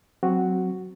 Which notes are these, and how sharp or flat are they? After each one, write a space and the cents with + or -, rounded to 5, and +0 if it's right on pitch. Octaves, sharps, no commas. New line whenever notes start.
F#3 +0 C4 +0 F#4 +0